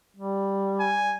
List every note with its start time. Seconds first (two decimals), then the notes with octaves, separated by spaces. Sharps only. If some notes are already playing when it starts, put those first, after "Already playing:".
0.17 G3
0.80 G#5